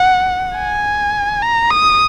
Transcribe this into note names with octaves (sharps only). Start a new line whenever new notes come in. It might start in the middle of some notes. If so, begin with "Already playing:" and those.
Already playing: F#5
G#5
A#5
D#6